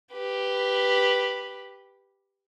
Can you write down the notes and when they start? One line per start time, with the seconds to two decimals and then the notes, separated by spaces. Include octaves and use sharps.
0.13 G4 B4